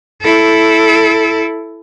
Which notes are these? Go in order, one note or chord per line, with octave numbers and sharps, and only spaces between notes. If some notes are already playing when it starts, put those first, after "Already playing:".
E4 A4